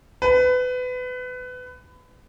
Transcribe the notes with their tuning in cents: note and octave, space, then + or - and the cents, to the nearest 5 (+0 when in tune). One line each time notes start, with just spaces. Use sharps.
B4 +25